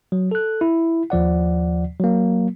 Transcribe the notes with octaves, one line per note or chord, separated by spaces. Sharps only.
F#3
A4 F#6
E4
D#2 F3 D5 F#5
F#3 A#3